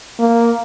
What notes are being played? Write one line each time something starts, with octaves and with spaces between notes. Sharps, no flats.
A#3